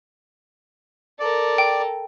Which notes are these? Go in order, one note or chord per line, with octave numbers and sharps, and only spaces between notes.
A4 A#4 D5
G5